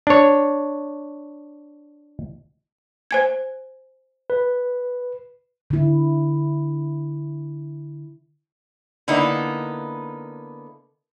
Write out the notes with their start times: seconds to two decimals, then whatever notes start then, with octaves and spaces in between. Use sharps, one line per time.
0.07 D4 C#5
3.11 C5 G#5 G#6
4.30 B4
5.70 D3 E4
9.08 D3 A#3 B3 D#4 E4